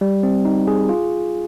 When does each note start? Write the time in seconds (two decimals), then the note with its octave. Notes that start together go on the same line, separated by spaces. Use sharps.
0.01 G3
0.23 C4
0.45 D#4
0.67 G#4
0.89 F4